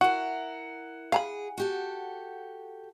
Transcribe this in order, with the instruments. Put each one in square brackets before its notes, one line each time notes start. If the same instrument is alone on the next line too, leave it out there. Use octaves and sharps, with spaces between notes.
[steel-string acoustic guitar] E4 A#4 [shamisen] F#4 [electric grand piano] F#5
[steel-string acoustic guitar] G#4 [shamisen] F5 A#5 B5
[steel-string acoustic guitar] F#4 G4 A4